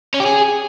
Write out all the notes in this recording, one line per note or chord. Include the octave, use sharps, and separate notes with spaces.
C#4
G4
G#4